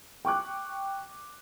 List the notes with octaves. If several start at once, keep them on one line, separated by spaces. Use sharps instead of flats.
G5 C#6 D6 F#6